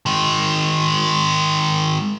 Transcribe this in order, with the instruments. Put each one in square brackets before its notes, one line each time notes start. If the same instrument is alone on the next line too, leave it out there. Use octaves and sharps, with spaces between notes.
[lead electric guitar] D#3 G#3